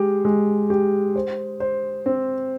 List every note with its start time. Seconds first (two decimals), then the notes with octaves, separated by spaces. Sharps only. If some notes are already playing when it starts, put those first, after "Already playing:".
Already playing: G#3 G4
0.25 G#3
0.70 G4
1.16 C5
1.60 C5
2.06 C4